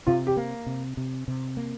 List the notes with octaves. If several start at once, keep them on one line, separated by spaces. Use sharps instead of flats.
C3 F4
G4
A#3
C3
C3
C3
A#3